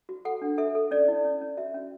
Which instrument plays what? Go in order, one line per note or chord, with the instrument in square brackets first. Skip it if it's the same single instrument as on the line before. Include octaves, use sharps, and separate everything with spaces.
[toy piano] F#4
A4 F#5
D4
A4 E5
A4
C#4 D5
E4
C#4
C#4
F#4 E5
C#4